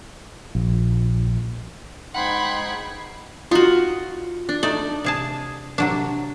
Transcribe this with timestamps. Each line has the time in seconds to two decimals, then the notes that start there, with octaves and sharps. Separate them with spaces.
0.55 A#1
2.15 G#2 D#4 F#5 G5 B5 C6 G#6
3.51 D#4 F4 F#4
4.49 D4
4.63 A3 D#4 D5
5.04 C3 G#4 A5
5.78 C3 F#3 D4